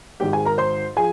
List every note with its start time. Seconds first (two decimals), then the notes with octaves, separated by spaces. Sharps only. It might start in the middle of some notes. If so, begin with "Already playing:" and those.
0.20 G#1 G#2 D#3 G4 G5
0.33 G#4 G#5
0.45 A#4 A#5
0.58 C5 C6
0.97 F3 G#4 G#5